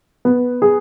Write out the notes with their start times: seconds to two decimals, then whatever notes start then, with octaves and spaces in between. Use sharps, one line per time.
0.25 B3
0.62 G#4